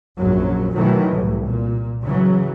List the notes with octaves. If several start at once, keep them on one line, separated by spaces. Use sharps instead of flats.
A#1 F#2 F#3
B2 D#3 E3 F#3 A3
C2 A2
A#2
C#3 E3 F#3